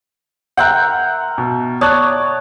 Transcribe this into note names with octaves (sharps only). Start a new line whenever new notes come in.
A#4 E5 F#5 G5 C6 F#6
B2
C#5 D5 A5 D#6 F#6